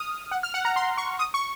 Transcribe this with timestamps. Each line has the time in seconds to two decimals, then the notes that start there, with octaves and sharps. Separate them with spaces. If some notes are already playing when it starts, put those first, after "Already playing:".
Already playing: D#6 F6
0.31 F#5
0.43 F6
0.54 F#5
0.65 A#5
0.76 C6
0.98 C#6
1.19 D#6
1.34 C#6